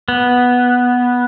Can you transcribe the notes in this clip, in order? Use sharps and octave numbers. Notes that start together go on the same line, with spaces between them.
B3